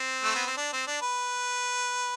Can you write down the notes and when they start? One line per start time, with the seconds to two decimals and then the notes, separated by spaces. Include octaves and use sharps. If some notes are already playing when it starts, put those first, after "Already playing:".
Already playing: C4
0.24 A3
0.35 B3
0.47 C4
0.57 D4
0.72 C4
0.87 D4
1.02 B4